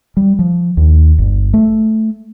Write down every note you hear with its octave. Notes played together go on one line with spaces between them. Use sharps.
G3
F3
D#2
G1
A3